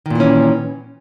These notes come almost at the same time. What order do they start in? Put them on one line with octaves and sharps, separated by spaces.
D#3 A#2 E3 C#4